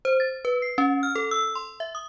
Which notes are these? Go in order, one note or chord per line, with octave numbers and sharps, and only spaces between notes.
C5
A6
B4
C7
C#4
F6
A4
E6
C6
E5
D#6